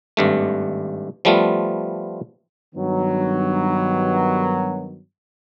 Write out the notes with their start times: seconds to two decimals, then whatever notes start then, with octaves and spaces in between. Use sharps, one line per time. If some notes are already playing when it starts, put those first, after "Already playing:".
0.17 G#1 G2 A3
1.25 F3 G3 A3 B3 F4
2.74 G2 D#3 F#3 B3